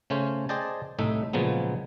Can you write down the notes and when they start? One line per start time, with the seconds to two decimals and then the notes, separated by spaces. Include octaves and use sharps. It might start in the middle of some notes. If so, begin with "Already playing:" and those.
0.10 C#3 A3 C#4 C5
0.49 G#4 C5 D5 D#5 G5 A5
0.99 C2 A2 A3 D#4 E5
1.33 A#2 C#3 F3 F#3 G#3 B3